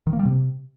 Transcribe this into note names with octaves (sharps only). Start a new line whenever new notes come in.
D#3
A#3
G3
C3